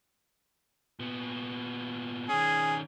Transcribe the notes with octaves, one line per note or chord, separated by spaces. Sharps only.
A#2 B3
D#3 C#4 G#4